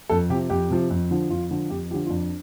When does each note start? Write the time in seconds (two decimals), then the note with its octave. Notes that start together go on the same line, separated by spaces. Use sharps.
0.10 F2 A4
0.30 C3 G4
0.34 F3
0.50 F2 G4
0.71 C3 F3
0.90 F2
1.11 D3 F3
1.30 F2 F4
1.51 D3 F3
1.70 F2 G4
1.90 F3 G4
1.94 D3
2.06 F4
2.10 F2 D4